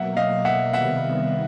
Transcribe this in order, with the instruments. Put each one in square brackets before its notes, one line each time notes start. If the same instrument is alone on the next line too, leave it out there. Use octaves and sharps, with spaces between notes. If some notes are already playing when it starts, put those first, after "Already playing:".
Already playing: [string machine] B2 F#3 A#3 [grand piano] E5 F#5
[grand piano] D#5 F5
E5 F#5
[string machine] C3 D#3 G3 B3 [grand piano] E5 F#5